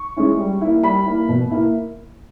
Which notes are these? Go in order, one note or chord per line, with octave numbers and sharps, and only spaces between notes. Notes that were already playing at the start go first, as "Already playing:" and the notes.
Already playing: C#6
G#3 C#4 E4
G3
A#3 E4
G3 B5
A#3 E4
B2
A#3 E4